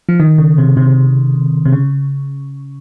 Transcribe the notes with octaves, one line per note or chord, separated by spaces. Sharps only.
F3
D#3
C#3
C3
C3
C3
C#3